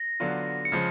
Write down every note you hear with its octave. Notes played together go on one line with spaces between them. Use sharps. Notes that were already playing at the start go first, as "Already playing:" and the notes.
Already playing: A#6
D3 F#3 B3 D4 F4
C#7
C#3 F3 G#3 C7